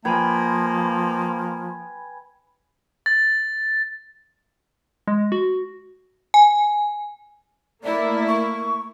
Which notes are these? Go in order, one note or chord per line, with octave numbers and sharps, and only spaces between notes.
F3 A#3 B4 G5 G#5 B5 G#6
A6
G#3
F#4
G#5
A3 A#3 E4 D5
C#6